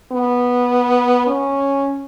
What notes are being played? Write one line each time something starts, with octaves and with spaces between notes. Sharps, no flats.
B3
C#4